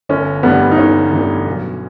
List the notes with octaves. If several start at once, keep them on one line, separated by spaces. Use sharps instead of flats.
G1 C#4
G2 E3 G3 B3
D#4
G1 C#4
G2 E3 G3
B1